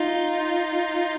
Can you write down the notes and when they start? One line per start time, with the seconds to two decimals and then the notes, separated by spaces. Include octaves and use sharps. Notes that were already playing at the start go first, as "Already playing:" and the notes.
Already playing: D#4 F4